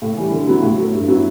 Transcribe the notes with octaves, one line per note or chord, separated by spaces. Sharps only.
A2
E3 G3
D3
F#3 B3 E4
A2
F#3 A3
G2
F#3 B3 E4